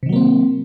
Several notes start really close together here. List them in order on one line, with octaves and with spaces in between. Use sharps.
C3 D#3 F#3 A#3 C4